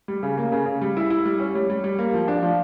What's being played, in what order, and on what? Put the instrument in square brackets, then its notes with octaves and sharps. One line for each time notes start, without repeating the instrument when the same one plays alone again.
[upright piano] G3
C#3
A#3
C#3
C#3
G3
E4
E4
G3
C#4
G3
G3
G3
A#3
F3
D4
F3